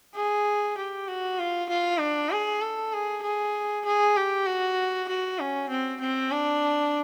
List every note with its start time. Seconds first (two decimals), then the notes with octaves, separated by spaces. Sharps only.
0.15 G#4
0.77 G4
1.08 F#4
1.39 F4
1.69 F4
2.00 D4
2.31 G#4
2.61 A4
2.93 G#4
3.23 G#4
3.85 G#4
4.16 G4
4.46 F#4
5.08 F#4
5.39 C#4
5.69 C4
6.00 C4
6.31 D4